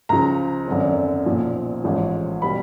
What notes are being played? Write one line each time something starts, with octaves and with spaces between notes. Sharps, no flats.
C#2 C#3 F3 A#5
G#1 F#2 D3
B1 A#2 F3
A1 G#2 F3
B2 G3 B5